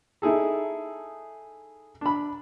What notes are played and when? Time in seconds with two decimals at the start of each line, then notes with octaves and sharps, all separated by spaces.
0.22 D#4 E4 G#4 A4
2.01 D4 B5